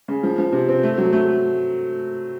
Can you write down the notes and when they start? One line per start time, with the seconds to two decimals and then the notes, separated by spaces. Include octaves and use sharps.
0.08 C#3
0.23 F3
0.38 F3
0.52 C3
0.68 C4
0.83 A3
0.98 F#3
1.13 A3
1.28 A3